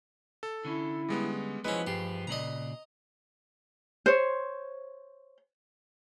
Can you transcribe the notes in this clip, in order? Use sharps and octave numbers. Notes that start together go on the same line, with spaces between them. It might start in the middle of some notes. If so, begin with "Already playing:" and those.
A4
D3 C#4 E4
G3 G#3 B3
F3 G#3 B3 C#4 E4 F#4 B4
G2 F4 G4 G#4
A#2 C#3 D5 D#5 A#5
C5 C#5